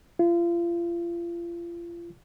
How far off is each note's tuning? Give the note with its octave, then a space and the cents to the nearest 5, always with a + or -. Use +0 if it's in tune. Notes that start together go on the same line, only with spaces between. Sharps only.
F4 -35